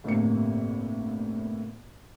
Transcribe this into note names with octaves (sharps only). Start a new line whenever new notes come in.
G1 A2 C3 A#3 C#7